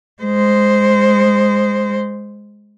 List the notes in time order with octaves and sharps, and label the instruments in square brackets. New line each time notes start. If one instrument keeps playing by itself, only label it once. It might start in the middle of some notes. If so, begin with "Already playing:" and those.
[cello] G#3 C5